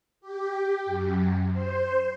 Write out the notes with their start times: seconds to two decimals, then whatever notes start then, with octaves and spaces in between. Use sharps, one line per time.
0.21 G4
0.86 F#2
1.51 C5